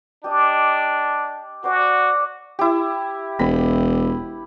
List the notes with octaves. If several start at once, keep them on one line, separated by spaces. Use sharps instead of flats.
D4 G4 D#5
F#4 C5 D5 G#5
E4 G4
E1 B5